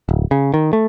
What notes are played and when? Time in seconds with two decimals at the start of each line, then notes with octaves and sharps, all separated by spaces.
0.09 D1
0.31 C#3
0.54 D#3
0.73 A3